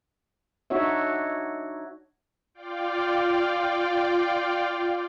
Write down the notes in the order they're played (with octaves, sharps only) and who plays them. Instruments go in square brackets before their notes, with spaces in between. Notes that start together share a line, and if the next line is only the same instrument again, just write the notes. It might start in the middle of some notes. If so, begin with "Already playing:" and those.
[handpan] D4 D#4 F#4 C#5 E5
[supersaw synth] F4 D5 F5 G5 D6